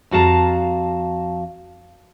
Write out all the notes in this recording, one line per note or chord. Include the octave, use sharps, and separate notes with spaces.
F2 F#4 F5 A5 A#5